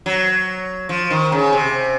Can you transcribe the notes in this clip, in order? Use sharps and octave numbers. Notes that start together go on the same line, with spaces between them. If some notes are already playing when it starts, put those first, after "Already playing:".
F#3
F3
D#3
C#3
C3